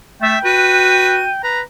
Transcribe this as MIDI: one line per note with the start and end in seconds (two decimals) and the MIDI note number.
0.22 0.36 57
0.22 0.39 76
0.22 1.43 79
0.45 1.29 66
0.45 1.17 71
0.45 1.31 99
1.43 1.61 71
1.43 1.60 82